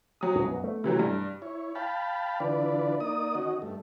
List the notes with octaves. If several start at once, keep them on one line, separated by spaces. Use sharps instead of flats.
F#3 D#6
B1 F#2
B3
A3
C3 E3 F#3
G2
E4 C#5
F5 G5 A5 B5
D3 E3 D4 F4 B4 D5
A#3 D#4 D5 D#6
D#3 C#4 F#4 D#5
G2 A3